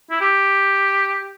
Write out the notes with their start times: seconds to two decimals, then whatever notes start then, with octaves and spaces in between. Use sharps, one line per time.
0.11 E4
0.21 G4